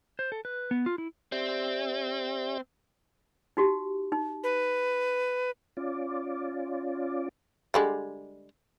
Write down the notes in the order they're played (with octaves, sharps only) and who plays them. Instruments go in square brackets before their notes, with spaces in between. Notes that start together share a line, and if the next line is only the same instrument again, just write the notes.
[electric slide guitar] C5
A4
B4
B3
F4
E4
[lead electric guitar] C4 [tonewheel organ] G4 D5 E5
[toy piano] D#4 F#4 G4
D#4
[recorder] B4
[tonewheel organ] C#4 F4 D5
[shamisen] D3 G3 G#3